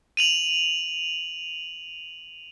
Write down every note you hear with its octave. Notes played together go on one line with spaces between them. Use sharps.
D#7 F7 F#7